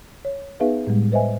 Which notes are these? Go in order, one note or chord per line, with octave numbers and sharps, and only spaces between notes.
C#5
B3 D#4 G#4 B4 E5 F5
A2 G3 G#3
B4 C5 D#5 E5 G#5